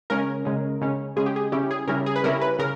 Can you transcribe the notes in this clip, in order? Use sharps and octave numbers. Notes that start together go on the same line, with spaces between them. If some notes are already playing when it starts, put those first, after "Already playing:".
C#3 G#3 C#4 A#4
C#3 G#3 C#4
C#3 G#3 C#4
C#3 G#3 C#4 G#4
G4
G#4
C#3 G3 C#4 E4 G4
G#4
C#3 G3 C#4 E4 A#4
G#4
B4
C#3 G3 C#4 E4 A#4
B4
C#3 A#4